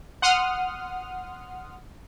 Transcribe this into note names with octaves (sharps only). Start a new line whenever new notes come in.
F#5 C6 D#6 F6